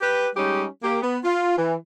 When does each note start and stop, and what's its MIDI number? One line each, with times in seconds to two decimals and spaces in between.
0.01 0.28 67
0.01 0.28 71
0.36 0.66 55
0.36 0.66 56
0.36 0.66 61
0.36 0.66 63
0.36 0.66 67
0.84 0.99 58
0.84 0.99 67
1.02 1.17 59
1.24 1.55 65
1.58 1.74 52